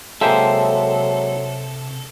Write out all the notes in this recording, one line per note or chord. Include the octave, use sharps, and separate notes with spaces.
C3 F#3 G#3 A#3 A4 C5 E5 G5